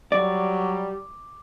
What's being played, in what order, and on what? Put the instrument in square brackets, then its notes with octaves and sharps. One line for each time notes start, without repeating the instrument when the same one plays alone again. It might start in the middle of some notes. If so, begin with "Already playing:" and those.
[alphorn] F#3 [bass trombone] G3 [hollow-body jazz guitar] D5 [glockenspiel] D6